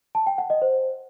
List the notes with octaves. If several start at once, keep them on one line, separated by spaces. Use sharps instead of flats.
A5
G5
F#5
D#5
C5